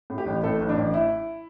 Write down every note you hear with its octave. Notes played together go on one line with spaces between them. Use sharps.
A2
G4
A1
A2 A4
A1
D4
A1
E4